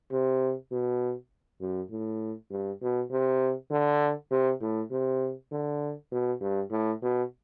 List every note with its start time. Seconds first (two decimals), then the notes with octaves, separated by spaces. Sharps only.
0.11 C3
0.71 B2
1.61 F#2
1.91 A2
2.51 G2
2.82 B2
3.11 C3
3.71 D3
4.31 C3
4.61 A2
4.91 C3
5.52 D3
6.12 B2
6.41 G2
6.71 A2
7.02 B2